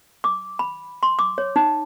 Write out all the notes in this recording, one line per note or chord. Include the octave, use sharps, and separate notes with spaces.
D6
B5
C6
D6
C#5
D#4